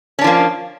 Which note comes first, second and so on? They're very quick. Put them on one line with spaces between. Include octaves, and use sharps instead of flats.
C#4 D4 F3 A#3